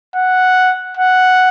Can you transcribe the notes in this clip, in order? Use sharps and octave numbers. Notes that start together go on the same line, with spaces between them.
F#5
F#5